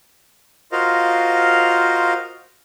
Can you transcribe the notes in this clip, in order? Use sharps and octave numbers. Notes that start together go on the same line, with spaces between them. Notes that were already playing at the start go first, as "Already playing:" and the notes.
F4 F#4 A#4 C5 D#5 F5